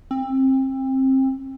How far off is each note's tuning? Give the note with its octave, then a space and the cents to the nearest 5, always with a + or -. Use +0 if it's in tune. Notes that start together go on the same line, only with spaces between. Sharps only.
C4 +25